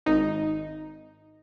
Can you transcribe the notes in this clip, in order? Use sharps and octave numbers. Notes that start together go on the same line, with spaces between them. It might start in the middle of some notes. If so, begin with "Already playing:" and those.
G#1 D#4